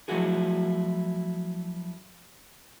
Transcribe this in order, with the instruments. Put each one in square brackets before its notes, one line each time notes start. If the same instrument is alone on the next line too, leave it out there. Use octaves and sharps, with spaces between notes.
[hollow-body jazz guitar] F3 F#3 A3 E4 F#4 G#4